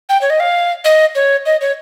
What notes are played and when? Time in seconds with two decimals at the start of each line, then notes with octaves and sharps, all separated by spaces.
0.09 G5
0.21 C#5
0.30 D#5
0.40 F5
0.84 D#5
1.15 C#5
1.46 D#5
1.61 C#5